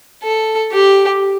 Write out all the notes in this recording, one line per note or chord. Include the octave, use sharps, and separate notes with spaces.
A4
G4